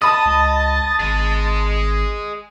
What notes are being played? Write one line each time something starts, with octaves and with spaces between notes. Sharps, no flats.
D#5 A5 B5 D#6 A6
C#2
G#1 G#4 D#5